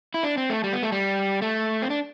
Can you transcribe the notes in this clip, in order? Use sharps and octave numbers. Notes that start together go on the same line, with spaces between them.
E4
D4
C4
A3
G3
B3
A3
G3
A3
C4
D4